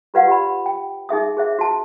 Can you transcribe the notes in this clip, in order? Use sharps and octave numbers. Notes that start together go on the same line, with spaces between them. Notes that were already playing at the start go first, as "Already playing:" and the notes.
F4 G4 B4 D5 F5 F#5
G4 B5
G5
D#4 G#4 E5 D#6
G#4 C5 E5
F#4 A5